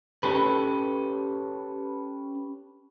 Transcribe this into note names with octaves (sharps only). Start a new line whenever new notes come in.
C#4 G4 A4 B4